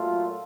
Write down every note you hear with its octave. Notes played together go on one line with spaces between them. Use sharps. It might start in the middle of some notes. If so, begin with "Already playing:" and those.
Already playing: A#2 F#3 A3 F4